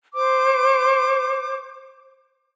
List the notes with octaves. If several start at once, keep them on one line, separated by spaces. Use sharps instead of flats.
C5 D6